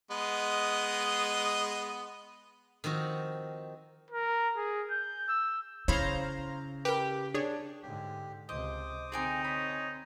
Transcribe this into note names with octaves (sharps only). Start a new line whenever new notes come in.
G#3 B3 D#5
D#3 F3 C4 F#4
A#4
G#4
G6
E6
C#3 E4 C5 C#5 F5 A#5 B5
G4 A#4 B4
D4 G#4 C#5
G#2 D3 G4
C#2 C3 C5 D#5 D6 D#6
D3 C4 D#4 G#4 G5 G#5
C#5 D#5 B5